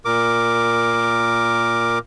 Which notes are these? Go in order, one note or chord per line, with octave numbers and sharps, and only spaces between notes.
A#2 A#4 D6